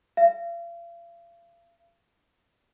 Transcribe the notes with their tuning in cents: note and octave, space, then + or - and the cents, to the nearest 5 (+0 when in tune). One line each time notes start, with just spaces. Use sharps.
F5 -40